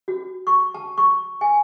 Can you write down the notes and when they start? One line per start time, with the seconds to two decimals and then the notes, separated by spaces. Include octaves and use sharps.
0.08 F#4
0.47 C#6
0.74 A5
0.98 C#6
1.41 G#5